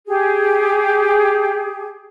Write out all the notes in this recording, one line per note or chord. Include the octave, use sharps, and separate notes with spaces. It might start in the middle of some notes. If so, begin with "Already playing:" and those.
G4 G#4